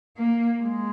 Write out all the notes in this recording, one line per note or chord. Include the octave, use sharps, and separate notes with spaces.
A#3
G#3